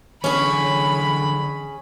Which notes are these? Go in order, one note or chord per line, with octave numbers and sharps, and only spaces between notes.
D3 E3 C#4 G#4 B5